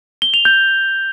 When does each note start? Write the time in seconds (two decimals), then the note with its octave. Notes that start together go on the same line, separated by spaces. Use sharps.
0.22 G7
0.34 F7
0.45 G6